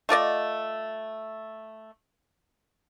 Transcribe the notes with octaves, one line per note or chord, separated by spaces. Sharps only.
A3 F4 D5 D#5